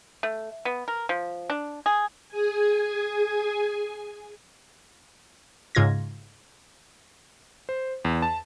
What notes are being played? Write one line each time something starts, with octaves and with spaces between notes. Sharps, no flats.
A3
B3
A#4
F3
D4
G#4
G#4 G#5
G#2 C#3 F4 G#6 A#6
C5
E2
A5